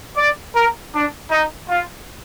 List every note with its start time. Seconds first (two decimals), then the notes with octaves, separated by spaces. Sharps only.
0.17 D5
0.55 A#4
0.93 D4
1.31 D#4
1.69 F4